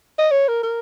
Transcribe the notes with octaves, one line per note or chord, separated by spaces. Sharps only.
D#5
C#5
A#4
A#4